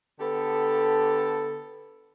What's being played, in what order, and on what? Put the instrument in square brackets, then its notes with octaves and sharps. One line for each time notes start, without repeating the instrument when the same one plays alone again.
[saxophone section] D3 B3 G4 A4